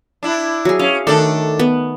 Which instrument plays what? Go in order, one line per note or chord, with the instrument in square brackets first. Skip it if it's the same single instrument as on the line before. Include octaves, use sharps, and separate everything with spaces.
[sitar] D4 E4
[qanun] F#3 G#4
[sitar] C#4 [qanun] F5
[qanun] D#3 A3 [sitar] D4 A4 D5
[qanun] B3